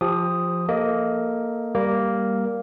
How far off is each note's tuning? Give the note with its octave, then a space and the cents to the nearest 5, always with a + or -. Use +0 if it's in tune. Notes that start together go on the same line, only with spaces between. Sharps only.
F3 +0 G4 +25 D#6 +0
A#3 +0 A4 +0 D#5 +20
G3 +0 A#3 +0